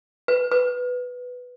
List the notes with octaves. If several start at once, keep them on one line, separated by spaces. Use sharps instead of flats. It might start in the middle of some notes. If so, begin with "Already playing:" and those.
B4
B4